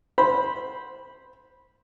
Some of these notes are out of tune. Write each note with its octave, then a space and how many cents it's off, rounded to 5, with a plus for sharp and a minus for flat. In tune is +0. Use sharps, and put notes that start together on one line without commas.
C5 +0 B5 -15